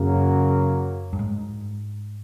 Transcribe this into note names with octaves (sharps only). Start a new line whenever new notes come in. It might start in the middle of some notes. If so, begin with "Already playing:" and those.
Already playing: F#2 C#3 F#3 A#3
G2
G#2